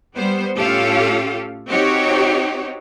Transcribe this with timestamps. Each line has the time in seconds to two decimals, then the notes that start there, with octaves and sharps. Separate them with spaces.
0.16 G3 B3 C5
0.58 A2 C#4 F4 G4 A4 F5
1.69 C4 D#4 F#4 G4 C#5